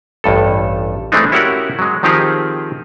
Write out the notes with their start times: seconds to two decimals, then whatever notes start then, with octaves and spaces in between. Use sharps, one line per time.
0.24 A1 G2 A4
1.12 E3 G#3 A3 C4 D4 D#4
1.32 C#4 E4 F#4 G4 A#4 F#5
1.79 F#3 G#3
2.03 D#3 F3 C4 D#4 G4 G#4